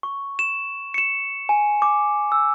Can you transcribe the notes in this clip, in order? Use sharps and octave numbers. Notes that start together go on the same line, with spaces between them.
C#6
E7
C#7 E7
G#5
D6
E6